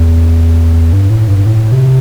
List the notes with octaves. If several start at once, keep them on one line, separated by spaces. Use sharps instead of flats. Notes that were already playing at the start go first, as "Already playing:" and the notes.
Already playing: E2
G2
A2
G2
A2
C3